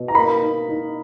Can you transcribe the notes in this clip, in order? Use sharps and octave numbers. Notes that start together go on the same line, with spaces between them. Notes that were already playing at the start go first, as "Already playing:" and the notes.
Already playing: B2
A#5
A#3 B5
D#4
D#4